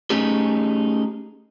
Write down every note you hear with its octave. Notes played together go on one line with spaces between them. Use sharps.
A3 C#4 D#4 G4 G#4